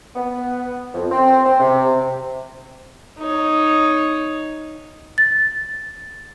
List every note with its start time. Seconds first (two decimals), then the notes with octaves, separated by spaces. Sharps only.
0.16 B3
0.94 F2
1.11 C4
1.45 C4
1.60 C3
3.18 D#4 C#5
5.18 A6